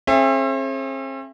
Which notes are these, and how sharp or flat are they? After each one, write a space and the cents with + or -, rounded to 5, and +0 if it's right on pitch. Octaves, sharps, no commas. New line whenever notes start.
C4 +45 G#4 +40 E5 +25